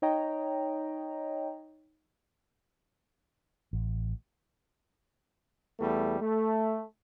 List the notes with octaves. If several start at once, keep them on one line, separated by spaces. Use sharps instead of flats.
D#4 C#5 D#5 G5 A#5
A1
E2 G3 A3
A3